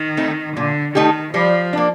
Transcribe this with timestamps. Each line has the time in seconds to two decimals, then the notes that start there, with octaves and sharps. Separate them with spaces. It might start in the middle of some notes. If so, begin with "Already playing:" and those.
Already playing: D#3
0.17 A3 C4 D#4
0.56 A#2 D3
0.95 D#3 A3 D#4 G4
1.33 F3 G3
1.73 A#3 D4